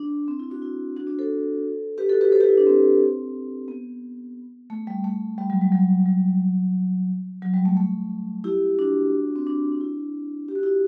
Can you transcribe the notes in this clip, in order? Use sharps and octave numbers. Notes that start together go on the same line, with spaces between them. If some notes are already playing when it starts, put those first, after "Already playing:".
Already playing: D4
C4
E4
D4 F#4
E4
D4 F#4
D4 F#4
A4 C5
G4 B4
F#4 A4
G4 B4
A4 C5
G4 B4
E4
D4
C4
B3
A3
G3
A3
G3
F#3
G3
F#3
F#3
F#3
G3
A3
A3
E4 G4
D4 F#4
C4
D4
D4
E4
G4
F#4
E4 G4